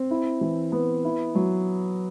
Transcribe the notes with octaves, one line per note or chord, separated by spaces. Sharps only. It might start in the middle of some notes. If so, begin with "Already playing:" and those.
Already playing: C4
E4
E3
B3
E4
F#3